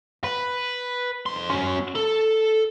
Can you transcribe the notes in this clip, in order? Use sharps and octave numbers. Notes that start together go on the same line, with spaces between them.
B4
F2 C6
C#4 F#4
A4